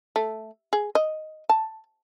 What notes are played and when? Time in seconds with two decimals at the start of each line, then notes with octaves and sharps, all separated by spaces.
0.16 A3
0.73 G#4
0.95 D#5
1.49 A5